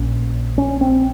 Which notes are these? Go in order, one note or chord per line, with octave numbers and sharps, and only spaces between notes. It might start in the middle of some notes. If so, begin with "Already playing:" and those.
Already playing: A#1 A#2 C#4
C#4
C4